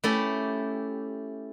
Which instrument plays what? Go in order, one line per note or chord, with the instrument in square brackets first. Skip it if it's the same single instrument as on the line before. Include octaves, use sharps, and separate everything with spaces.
[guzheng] A3 C#4 E4 G4 A4